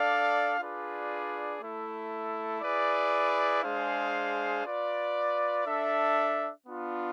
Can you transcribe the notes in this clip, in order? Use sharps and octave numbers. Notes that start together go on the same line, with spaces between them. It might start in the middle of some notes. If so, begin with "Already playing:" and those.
Already playing: D4 A4 D5 F5
D4 F4 G#4 B4 D5
A3 E4 A4
E4 G#4 B4 D5
G#3 D4 G#4 C5 F5
F4 B4 D5
D4 A4 E5
B3 D4 F4